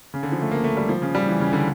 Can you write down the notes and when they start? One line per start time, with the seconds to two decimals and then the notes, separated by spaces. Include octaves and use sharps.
0.14 C#3
0.23 D3
0.32 F3
0.42 A3
0.51 A#3
0.64 A3
0.77 G3
0.89 F3
1.02 C#3
1.15 G3
1.28 E3
1.40 C#3
1.53 D3